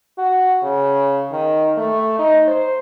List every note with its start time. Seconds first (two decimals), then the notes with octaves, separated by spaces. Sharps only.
0.18 F#4
0.63 C#3
1.32 D#3
1.77 A3
2.19 D#4
2.47 C5